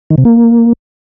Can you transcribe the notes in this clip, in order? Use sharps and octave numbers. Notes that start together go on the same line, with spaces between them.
D#3
C3
A#3